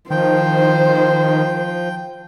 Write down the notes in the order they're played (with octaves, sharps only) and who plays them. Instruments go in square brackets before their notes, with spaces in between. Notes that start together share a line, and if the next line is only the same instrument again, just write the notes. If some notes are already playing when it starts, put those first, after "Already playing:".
[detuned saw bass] D#3 [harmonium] F3 [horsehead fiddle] C5 [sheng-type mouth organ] G5